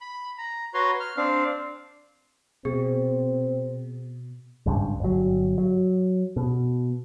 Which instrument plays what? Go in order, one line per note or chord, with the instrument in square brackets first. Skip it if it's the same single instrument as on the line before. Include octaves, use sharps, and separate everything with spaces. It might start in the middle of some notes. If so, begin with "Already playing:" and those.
[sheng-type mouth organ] B5
A#5
F#4 B4 C#5 A#5 C6
F6
C4 D4 F5
[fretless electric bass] B2 [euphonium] C4 [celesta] G#4
[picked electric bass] G#1 C#2 G2
G1 F#3
F#3
B2